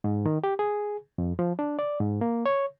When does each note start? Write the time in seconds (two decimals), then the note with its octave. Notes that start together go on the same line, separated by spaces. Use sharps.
0.04 G#2
0.26 D#3
0.44 G4
0.59 G#4
1.18 F2
1.39 F3
1.59 D4
1.79 D5
2.00 G#2
2.21 A#3
2.46 C#5